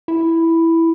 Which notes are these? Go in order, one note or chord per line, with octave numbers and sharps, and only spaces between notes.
E4